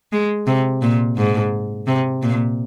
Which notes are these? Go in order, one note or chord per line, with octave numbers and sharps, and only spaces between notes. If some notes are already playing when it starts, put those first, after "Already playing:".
G#3
C3
A#2
G#2
C3
A#2